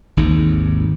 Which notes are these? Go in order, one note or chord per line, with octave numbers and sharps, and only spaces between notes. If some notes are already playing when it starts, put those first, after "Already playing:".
G#1 D#2 G#2